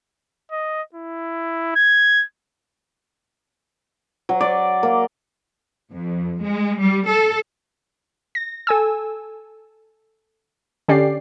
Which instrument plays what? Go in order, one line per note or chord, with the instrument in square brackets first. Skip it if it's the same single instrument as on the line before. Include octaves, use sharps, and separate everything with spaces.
[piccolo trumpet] D#5
E4
G#6
[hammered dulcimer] F#3
D5
A#3
[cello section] F2
G#3
G3
A4
[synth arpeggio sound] A#6
A4 G#5 E6
D3 C#4 G4 D5 C7